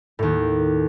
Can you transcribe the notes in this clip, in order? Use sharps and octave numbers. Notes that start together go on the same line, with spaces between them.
D#2 A2